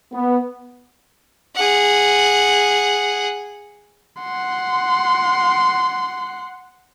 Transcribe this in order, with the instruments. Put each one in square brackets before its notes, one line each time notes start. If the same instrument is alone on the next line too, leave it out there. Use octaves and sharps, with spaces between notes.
[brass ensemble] B3
[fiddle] G#4 F#5
[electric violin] F#5 C6